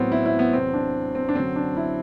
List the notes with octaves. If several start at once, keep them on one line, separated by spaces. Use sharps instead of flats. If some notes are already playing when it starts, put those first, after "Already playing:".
Already playing: A2 F#3 B3 C4
E4
E4
B3
E2 C3 F#3 C4
D4
C4
D4
F#2 D3 F#3 C4
D4
E4